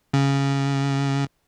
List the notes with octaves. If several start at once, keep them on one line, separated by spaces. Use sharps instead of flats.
C#3